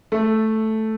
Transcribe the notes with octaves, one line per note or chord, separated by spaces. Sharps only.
A3